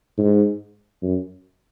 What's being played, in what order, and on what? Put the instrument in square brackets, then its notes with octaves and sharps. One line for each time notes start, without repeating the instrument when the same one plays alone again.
[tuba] G#2
F#2